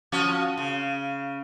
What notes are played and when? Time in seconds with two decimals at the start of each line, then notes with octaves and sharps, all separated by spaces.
0.12 F3 C#4 F#4
0.57 C#3